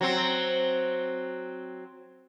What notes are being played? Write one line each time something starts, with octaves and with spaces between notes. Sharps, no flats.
F#3 C4